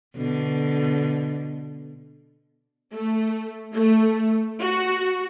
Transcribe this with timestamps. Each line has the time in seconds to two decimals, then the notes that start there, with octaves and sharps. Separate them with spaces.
0.16 B2 D3
2.92 A3
3.74 A3
4.60 F#4